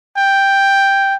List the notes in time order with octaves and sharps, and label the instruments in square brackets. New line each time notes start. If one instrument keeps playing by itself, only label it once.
[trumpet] G5